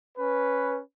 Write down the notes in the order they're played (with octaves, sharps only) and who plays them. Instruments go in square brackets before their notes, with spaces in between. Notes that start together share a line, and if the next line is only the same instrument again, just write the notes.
[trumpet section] C#4 B4